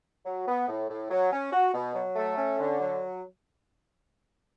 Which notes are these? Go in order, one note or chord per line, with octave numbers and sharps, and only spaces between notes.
F#3
B3
A2
A2
F#3
C#4
F#4
B2
F#3
A3
C#4
D3
F#3